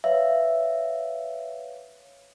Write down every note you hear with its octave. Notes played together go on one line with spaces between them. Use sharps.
B4 C#5 E5 F5